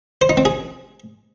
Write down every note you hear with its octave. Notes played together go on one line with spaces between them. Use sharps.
C5
D#4
C4
G#4